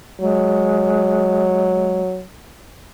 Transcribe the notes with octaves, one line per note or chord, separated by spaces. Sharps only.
F#3 G#3